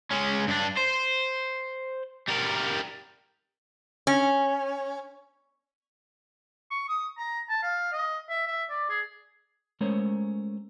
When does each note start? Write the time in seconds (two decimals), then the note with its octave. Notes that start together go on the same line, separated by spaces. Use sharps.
0.12 G#3 C#4
0.48 G2 D4
0.77 C5
2.29 G3 A#4
4.07 C#4
6.71 C#6
6.89 D#6
7.18 A#5
7.49 A5
7.63 F5
7.92 D#5
8.29 E5
8.47 E5
8.70 D5
8.89 G#4
9.81 G#3 A3 C#4 A#4 C5 C#5